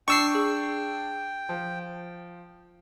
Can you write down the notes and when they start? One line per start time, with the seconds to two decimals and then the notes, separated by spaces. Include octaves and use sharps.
0.08 D4 G5 C#6 E6 C7
0.35 G#4
1.49 F3